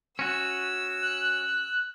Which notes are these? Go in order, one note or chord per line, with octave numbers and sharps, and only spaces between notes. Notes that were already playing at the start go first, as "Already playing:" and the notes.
C#4 F#4 E6
F#6